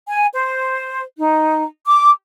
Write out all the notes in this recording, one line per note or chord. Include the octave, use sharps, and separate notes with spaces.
G#5
C5
D#4
D6